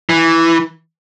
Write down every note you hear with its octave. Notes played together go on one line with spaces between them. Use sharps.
E3